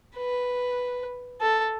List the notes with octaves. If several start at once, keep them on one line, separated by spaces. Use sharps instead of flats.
B4
A4